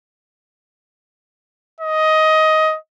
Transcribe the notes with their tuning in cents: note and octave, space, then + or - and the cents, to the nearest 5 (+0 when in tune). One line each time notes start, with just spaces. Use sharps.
D#5 +15